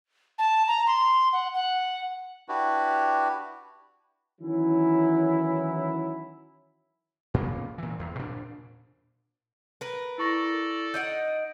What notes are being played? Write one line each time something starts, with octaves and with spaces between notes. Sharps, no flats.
A5
A#5
C6
F#5
F#5
D4 E4 F#4 G4 B4
D#3 E3 F#3 C#4 E4
A#2 C#3 A#3 B3
A#2 E3
E2
A#2 D4
A#4 B4
E4 A4 D5 C#6 A#6
D#4 D#5 F#5 G6 D7